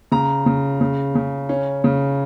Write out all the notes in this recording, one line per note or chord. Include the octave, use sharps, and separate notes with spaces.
C#3 A#5
C#3
C#3
C#3
C#4
C#3